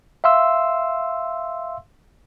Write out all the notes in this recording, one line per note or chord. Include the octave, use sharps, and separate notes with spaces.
E5 F5 C6 E6